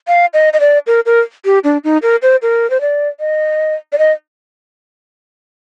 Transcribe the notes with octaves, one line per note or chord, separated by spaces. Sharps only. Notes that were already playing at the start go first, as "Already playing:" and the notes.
F5
D#5
D#5
D5
A#4
A#4
G4
D4
D#4
A#4
C5
A#4
C5
D5
D#5
D5
D#5